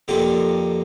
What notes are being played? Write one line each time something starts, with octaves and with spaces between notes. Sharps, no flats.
F2 D3 F3 A#3 D4 G4